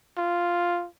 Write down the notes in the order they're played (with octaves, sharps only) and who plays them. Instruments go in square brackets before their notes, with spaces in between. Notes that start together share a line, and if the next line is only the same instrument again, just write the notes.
[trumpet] F4